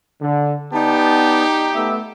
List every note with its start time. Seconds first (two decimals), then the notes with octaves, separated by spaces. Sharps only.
0.21 D3
0.73 B3 D#4 G4 D5 A5
1.74 A3 B3 E5